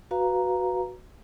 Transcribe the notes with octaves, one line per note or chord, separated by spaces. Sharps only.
F#4 B4 F5 A#5